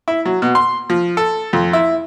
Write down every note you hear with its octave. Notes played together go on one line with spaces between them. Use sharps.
E4
F#3
B2
C6
F3
A4
F2
E4